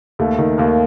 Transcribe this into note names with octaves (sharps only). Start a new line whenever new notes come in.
D#2 A3
D#3
D#2 A#3